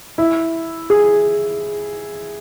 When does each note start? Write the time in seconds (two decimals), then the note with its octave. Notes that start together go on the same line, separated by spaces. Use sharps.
0.18 E4
0.90 G#4